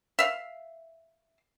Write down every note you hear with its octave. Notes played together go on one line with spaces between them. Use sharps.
E5 F5